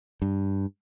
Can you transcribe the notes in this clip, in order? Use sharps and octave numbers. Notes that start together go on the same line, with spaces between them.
G2